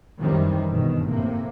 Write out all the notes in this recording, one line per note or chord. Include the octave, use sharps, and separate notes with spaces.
F#2 C3 D#3 E3 G3
G1 B2 D#3
A2 C3 A#3